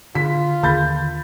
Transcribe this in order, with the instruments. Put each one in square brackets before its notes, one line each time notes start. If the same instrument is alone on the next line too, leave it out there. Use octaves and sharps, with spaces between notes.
[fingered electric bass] D3 [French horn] F4 [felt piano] B6
[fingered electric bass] D#2 D3 [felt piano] B5 G6 A6